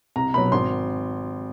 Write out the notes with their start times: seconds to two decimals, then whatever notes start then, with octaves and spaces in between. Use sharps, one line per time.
0.16 C2 A#5
0.34 B2 F#3 B5
0.52 G#1 C6